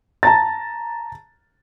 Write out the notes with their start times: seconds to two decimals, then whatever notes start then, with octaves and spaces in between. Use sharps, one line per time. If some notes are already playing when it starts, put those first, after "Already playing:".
0.23 A5 A#5 A6